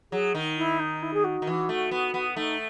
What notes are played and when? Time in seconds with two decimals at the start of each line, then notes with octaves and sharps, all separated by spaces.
0.12 F#3 G#4
0.35 D#3
0.57 E4
0.79 D#4
1.02 E4
1.14 G#4
1.24 F#4
1.42 D#3
1.47 E3
1.69 A3
1.91 B3
2.14 B3
2.36 A3 D#4